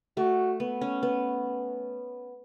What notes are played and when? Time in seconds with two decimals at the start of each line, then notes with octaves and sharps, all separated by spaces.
0.17 A3 F#4
0.60 B3
0.81 C#4
1.03 B3